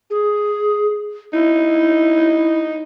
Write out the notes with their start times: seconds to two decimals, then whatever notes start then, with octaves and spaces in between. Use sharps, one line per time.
0.10 G#4
1.33 D#4 E4